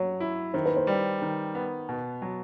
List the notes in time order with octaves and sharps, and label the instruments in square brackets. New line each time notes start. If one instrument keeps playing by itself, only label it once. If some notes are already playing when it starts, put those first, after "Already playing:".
Already playing: [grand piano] F#3 [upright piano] C#5
[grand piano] E4
[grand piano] D#3 [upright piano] C5
[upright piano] B4
C5
[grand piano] G3
D#3
B3
B2
F#3